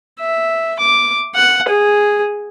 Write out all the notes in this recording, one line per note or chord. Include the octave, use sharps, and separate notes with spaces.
E5
D6
F#5
G#4